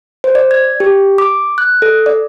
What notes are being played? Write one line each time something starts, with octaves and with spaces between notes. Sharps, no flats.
C5
D5
G#6
G4
D6
F#6
A4
D5